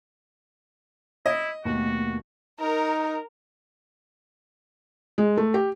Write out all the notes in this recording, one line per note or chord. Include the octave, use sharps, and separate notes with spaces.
E4 D#5
D#2 B2 A3 A#3 F#4
D#4 A#4
G#3
A3
G4